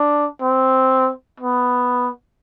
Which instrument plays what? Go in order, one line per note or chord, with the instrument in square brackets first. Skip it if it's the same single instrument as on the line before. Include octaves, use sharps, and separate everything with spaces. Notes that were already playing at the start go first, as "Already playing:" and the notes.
Already playing: [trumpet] D4
C4
B3